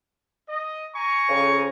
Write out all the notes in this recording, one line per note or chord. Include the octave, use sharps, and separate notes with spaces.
D#5
G#5 A#5 C#6
F2 C#3